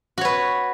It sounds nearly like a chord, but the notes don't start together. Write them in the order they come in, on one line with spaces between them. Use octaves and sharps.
F#4 C#5 B4